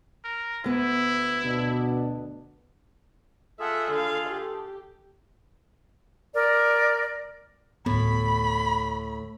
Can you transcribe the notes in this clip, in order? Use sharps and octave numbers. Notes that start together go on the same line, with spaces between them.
A#4
D2 B3 E4
B2 D4
F4 G#4 A4 E5 F#5
D3 F5
G4
A#4 D5
D2 A2 B3 B5